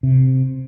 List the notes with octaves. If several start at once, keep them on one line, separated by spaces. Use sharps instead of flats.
C3